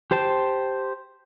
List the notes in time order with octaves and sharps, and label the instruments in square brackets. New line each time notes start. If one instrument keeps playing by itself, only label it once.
[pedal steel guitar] G4 C5 G5 A5